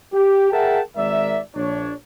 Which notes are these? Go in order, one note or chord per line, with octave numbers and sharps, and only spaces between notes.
G4
G#4 A#4 E5 F#5 G5 A5
G#1 G#2 A#4 D5 E5
A#1 D4 C#5